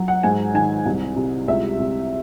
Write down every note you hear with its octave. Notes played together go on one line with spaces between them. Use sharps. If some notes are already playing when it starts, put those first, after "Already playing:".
Already playing: F#3
F#5
G#2 G#5
D#3 G#5
C2
C3
C#2 E5
C3